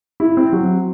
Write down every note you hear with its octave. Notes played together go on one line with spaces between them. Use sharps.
E4
C4
F#3